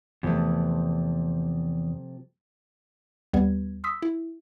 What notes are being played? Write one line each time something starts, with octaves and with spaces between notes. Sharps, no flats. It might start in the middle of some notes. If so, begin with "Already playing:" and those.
E2 C3 F3 A3
D#2 G3 B3 G#6
C6 D#6 E6 B6
E4